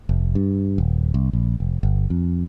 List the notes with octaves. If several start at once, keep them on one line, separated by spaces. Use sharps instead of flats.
F1
G2
D#1
C2
A#1
F1
G1
F2